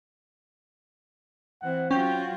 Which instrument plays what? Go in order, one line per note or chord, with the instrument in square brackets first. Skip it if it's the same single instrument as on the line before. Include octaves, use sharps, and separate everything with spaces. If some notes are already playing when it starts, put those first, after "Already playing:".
[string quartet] E3 C4 E4 [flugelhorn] F#5
[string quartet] F#3 F4 F#4 [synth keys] C#4 G6 [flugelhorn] G5